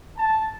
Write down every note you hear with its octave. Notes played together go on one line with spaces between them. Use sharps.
A5